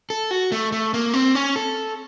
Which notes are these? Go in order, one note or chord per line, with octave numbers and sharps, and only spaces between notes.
A4
F#4
A3
A3
A#3
C4
C#4
A4